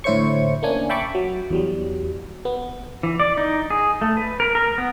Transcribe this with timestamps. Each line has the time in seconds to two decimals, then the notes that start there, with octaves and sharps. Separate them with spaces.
0.04 A2 D3 E4 C5 C#5 C#6
0.63 A#3 C#4 D4 G#5
0.89 E5 G5 A5 B5 C#6 D6
1.15 F#3
1.50 E2 F#3 G3
2.45 B3
3.03 E3
3.20 D5
3.37 D#4
3.70 G#4
4.01 A3
4.17 B4
4.40 A#4
4.55 A#4
4.78 B3